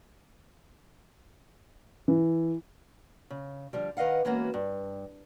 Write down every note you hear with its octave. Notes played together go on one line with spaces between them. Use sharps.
E3
C#3
D3 F3 G3
D#3 B4 D#5 F5 F#5
E3 G#3 A#3 B3 C#4 F#4
G2